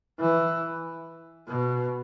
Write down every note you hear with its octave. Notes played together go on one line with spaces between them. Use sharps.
E3
B2